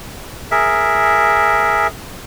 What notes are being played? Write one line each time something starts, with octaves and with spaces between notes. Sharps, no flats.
G#4 A#4 E5